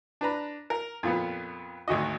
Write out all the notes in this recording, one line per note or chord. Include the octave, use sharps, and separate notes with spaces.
D4 B4 A#5
A#4
F2 A#2 B3
G#1 D2 F#4 D#5